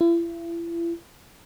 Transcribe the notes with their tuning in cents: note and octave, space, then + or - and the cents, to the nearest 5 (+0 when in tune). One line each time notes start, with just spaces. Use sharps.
E4 +40